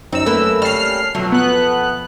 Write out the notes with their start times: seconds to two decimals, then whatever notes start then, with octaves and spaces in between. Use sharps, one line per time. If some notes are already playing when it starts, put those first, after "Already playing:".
0.13 F#2 C4 D#4 E6
0.26 A3 A#3 C4 E4 B4
0.62 G3 C#4 F6 C7
1.15 F2 B2 F#3 A3
1.32 B3 F#6